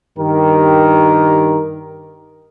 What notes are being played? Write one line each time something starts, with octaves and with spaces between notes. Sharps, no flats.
G2 D#3 G4 A#4